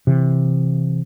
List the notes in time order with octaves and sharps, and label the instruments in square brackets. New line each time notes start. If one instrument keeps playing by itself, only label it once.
[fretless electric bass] C3 E3